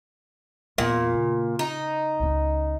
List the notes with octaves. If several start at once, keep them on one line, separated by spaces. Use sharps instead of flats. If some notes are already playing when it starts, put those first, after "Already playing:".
E2 A#2
C#3
D#4
C#2 C#4